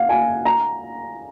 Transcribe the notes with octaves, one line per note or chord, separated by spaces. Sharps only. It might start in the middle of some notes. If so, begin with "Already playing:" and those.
Already playing: F5 F#5
G#5
A#5